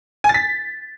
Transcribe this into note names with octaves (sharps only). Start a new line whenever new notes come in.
G#5
A6
B6